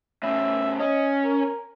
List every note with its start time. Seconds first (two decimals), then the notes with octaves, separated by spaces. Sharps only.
0.23 A2 C#3 E5
0.79 C#4 D#5
1.24 A#4